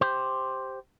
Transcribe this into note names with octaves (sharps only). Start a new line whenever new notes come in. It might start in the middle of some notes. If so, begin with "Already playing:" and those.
G4 C5